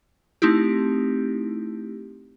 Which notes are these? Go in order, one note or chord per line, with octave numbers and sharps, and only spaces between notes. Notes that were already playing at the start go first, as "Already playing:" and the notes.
A3 C4 D#4 E4 G4